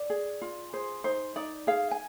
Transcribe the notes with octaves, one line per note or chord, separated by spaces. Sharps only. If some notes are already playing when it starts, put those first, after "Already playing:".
Already playing: D5
G#4
F4
G#4 C5
D#4 C5
D#4 D5
G#4 F5
G#5